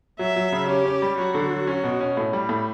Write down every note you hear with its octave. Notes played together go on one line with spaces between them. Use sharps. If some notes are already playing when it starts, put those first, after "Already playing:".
F#3 E5
F#3
C#3
C#4 G4
C#4
G3
F#3 F#4
D3
F#3
C#4
B2
C#4
A2
G3
A2